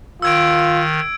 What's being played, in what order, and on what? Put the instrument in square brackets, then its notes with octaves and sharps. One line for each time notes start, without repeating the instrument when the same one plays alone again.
[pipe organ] D#3 [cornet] F4 [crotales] E6 G#6 D7